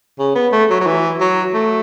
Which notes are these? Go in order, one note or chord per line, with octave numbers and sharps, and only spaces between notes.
C#3
B3
A3
F#3
F#3
E3
F#3
A3